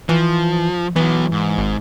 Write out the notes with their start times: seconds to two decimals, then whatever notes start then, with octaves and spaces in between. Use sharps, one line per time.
0.09 E3 F3
0.96 E3 F#3 B3
1.32 G#2
1.58 G#1